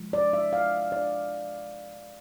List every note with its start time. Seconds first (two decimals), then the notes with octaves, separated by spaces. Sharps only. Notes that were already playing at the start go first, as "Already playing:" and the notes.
Already playing: C3 F3 G#3
0.13 D5
0.33 E5
0.53 F5
0.92 D5